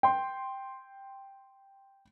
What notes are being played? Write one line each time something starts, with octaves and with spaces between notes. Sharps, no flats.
G5 C6